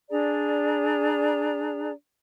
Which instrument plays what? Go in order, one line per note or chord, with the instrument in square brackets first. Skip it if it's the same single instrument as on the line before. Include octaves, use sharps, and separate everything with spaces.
[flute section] D4 G#4 D5 A#5